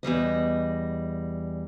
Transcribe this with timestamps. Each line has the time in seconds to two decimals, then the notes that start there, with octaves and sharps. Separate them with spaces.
0.03 E2 G#2 G3 D#5